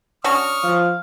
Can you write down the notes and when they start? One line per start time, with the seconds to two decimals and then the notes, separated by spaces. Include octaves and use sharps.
0.24 C#4 D4 F#4 C#6 D#6 F6
0.64 F3 F5